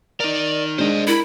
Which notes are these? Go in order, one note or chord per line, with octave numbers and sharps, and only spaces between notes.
D#4 A#4 D5
G#3 D4 C5 D#5
E4 A#4 B5